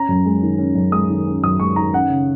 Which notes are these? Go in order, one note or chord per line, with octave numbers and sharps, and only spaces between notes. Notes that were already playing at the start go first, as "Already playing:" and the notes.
Already playing: C#4 A#5
F#2
G#3
D#3
C#4
F#2
G#3 D#6
D#3
C#4
F#2 D#6
G#3 C#6
D#3 A#5
C#4 F#5
C#3